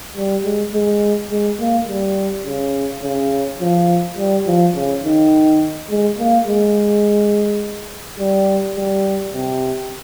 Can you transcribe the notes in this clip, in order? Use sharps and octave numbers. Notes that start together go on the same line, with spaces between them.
G3
G#3
G#3
G#3
A#3
G3
C#3
C#3
F3
G3
F3
C#3
D#3
G#3
A#3
G#3
G3
G3
C3